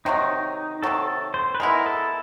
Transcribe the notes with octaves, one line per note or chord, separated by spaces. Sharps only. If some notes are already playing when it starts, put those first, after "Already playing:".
C3 D#3 F#3 D#4
C3 D#3 F#3 A4
C5
B4
G#3 B3 E4 A#4
A4